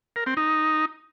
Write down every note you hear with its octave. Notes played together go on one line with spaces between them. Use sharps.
A#4
C4
D#4